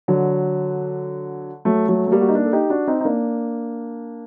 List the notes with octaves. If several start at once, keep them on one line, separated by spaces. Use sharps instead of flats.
D3 F#3
F#3 A3
F#3 A3
A3
G3 A#3
F#4
D#4
A#3 D4
A4
D#4 G4
D4 F#4
C4 D#4
D#4
A#3 D4